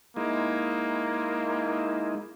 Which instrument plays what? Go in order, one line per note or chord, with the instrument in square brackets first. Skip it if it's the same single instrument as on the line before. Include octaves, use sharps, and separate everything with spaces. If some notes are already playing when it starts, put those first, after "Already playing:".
[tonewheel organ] G#3 D#4 E4 [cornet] A#3